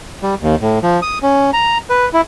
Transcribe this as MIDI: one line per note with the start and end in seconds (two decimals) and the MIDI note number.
0.23 0.35 55
0.42 0.55 39
0.61 0.79 45
0.83 1.00 53
1.02 1.18 87
1.23 1.51 61
1.53 1.78 82
1.90 2.09 71
2.13 2.21 64